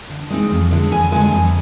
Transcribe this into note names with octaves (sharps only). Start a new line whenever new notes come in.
D3
G#3 C4 D#4
F2
D3 G#3
F2 G#5
D3 G#3 G#5
F2